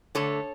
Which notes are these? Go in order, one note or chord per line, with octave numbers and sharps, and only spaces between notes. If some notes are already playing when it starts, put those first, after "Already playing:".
D3 A3 A4 C#5